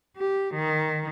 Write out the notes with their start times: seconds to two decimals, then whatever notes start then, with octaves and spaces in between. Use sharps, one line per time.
0.16 G4
0.54 D#3